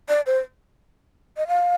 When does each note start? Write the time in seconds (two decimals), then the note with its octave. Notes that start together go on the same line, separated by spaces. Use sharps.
0.09 D5
0.26 C5
1.37 D#5
1.48 F5